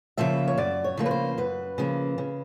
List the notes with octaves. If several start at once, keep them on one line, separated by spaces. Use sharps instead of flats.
C#3 F3 A#3 E5
C#5
F#2 D5
C#5
C#3 F3 A#3
B4
C5
F#2 B4
C#3 F3 A#3
C#3